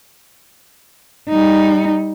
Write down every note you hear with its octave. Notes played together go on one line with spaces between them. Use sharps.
G3 D#4